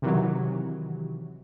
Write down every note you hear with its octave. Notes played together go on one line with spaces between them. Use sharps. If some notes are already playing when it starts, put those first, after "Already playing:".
C3 D#3 E3 F#3